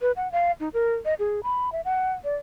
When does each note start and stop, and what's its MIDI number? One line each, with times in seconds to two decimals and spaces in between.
0.01 0.12 71
0.16 0.30 78
0.32 0.52 77
0.60 0.69 63
0.74 0.94 70
1.05 1.14 75
1.19 1.40 68
1.43 1.72 83
1.72 1.81 76
1.85 2.13 78
2.24 2.35 74